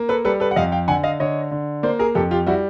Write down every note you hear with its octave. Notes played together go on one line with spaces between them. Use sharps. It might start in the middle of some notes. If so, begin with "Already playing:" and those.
Already playing: A#3
A4 B4
G3 A4 B4
A4 B4
F#5
F2 D#5 F5
F5 G5
D3 F#5 G#5
D#5 F5
D3 C#5 D#5
D3
A#3 C5 D5
G#4 A#4
F2 G4 A4
F4 G4
G3 E4 F#4